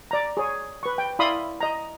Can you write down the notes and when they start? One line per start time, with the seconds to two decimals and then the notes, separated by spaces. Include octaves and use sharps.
0.11 D5 A#5
0.37 G#4 C#5
0.83 B4 C#6
0.98 G5
1.19 E4 D5 F5 B5 C6 D#6
1.61 D#5 A#5